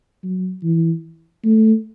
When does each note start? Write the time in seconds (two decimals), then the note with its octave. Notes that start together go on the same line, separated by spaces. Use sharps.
0.24 F#3
0.64 E3
1.45 A3